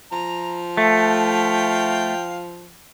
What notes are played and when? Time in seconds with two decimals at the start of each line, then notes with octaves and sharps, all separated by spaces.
0.12 F3 A#5
0.77 A3 F5 G5